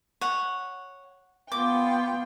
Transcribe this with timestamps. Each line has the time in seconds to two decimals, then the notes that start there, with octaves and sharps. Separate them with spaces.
0.21 C#5 F#5
1.52 B3 F4 G5 D6